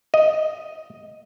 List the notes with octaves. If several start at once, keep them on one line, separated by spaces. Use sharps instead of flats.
D#5